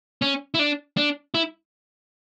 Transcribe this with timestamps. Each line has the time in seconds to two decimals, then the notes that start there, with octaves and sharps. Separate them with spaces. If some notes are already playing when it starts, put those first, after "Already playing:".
0.22 C#4
0.54 E4
0.59 D4
0.97 D4
1.34 E4